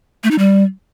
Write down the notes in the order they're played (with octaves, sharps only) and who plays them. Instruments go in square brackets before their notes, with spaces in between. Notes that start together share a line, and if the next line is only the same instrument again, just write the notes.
[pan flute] A3
D#4
G3